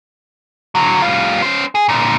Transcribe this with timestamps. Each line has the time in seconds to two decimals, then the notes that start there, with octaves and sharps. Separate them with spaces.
0.75 D3 F#3
1.02 G3 F4
1.42 C#4 C5
1.75 G#4
1.89 A#2 D3